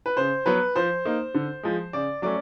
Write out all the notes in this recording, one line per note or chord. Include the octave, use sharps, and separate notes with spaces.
B4
C#3 C5
F#3 B3 B4
F3 C5
A#3 D#4
D3
F3 G#3
C#3 D5
F#3 A3 C#4 D5